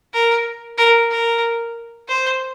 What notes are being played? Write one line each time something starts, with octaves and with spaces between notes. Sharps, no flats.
A#4
A#4
A#4
C5